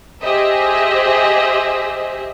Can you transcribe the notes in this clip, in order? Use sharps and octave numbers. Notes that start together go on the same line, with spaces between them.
G4 G#4 C5 D#5 E5